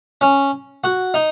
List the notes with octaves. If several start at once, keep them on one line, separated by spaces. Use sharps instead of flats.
C#4
F#4
D#4